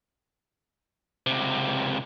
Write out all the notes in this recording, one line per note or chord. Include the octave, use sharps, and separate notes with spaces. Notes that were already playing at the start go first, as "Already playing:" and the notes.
C#2 C3